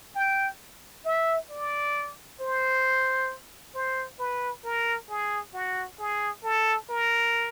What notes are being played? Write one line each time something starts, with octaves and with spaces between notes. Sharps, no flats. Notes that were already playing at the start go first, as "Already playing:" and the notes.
G5
E5
D5
C5
C5
B4
A#4
G#4
F#4
G#4
A4
A#4